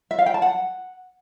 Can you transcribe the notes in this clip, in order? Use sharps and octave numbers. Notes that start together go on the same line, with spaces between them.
E5
F5
G5
A5
F#5